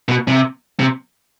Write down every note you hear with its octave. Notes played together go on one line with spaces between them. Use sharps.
B2
C3
C3